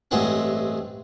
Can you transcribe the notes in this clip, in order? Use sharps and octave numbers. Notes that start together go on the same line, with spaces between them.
A1 G2 G#3 A3 C4 F#5